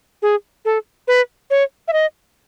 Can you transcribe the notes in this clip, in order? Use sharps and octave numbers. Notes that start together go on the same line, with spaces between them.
G#4
A4
B4
C#5
E5
D#5